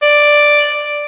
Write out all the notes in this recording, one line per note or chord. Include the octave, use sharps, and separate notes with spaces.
D5